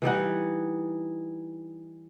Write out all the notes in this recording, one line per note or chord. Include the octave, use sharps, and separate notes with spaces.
E3 G3 D#4 F#5